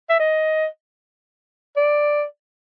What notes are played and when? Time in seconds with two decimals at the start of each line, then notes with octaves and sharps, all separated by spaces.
0.10 E5
0.19 D#5
1.76 D5